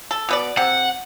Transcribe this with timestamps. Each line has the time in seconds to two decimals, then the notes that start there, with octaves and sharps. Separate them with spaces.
0.11 A4
0.29 B2 B3 D5
0.57 C3 F#5